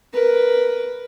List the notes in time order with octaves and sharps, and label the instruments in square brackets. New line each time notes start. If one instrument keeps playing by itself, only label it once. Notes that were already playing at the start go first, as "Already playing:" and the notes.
[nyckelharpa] A#4 B4